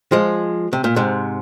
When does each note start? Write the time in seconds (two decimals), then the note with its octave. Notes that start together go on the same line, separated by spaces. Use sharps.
0.12 F3 G#3
0.73 C3
0.84 A#2
0.96 G#2 C3